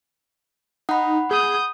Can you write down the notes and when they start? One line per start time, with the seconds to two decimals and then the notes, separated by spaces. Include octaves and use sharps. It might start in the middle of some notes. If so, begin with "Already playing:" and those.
0.89 D#4 F#5 B5
1.31 G#4 D#6 G6